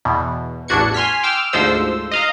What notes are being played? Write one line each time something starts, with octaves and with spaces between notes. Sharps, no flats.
E2 B2
A1 E2 D4 F#4 G#6 C#7
G#5 C6 F6 B6
G5 D6 E6 F6
D2 G#2 F3 C5 E6
D#5 F5 A#5